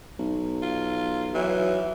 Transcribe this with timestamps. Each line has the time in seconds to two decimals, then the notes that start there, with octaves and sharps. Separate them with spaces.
0.19 B1
0.62 F4
1.35 E3 F#3